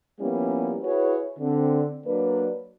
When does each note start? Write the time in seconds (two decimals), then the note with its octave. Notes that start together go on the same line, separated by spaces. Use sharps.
0.21 F3 G3 A#3 B3 C#4 E4
0.83 E4 F#4 G#4 B4 C#5
1.40 D3 C4
2.06 F#3 A#3 D4 B4